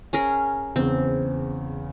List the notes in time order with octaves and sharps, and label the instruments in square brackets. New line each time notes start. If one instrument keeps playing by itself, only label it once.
[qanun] C#4 G#4 A#4
[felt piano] E2 C#3 [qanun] C4